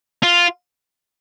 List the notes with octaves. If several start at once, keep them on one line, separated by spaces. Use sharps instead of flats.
F4